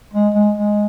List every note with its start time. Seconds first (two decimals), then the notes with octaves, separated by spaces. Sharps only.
0.14 G#3
0.35 G#3
0.58 G#3